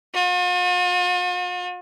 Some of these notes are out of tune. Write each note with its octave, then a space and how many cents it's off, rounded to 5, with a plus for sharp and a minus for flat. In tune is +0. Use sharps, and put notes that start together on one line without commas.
F4 +45